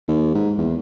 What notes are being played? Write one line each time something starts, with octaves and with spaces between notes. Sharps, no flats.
D#2
G#2
E2